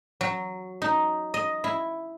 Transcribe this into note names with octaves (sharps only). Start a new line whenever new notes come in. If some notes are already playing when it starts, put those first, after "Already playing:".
F#3
D#4
D#5
E4